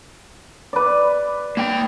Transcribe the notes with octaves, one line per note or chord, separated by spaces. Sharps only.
B4 D5
A#3 G5